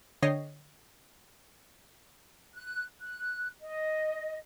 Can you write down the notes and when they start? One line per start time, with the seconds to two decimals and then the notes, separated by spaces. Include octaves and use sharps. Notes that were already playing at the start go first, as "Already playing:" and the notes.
0.22 D3 C#5 D#5 G5 A#6 C7
2.55 F#6
3.02 F#6
3.62 D#5